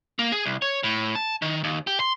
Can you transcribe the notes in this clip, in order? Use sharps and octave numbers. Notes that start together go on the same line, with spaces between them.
A#3
G#4
C2
C#5
A2
A5
D#3
D#2
G4
C6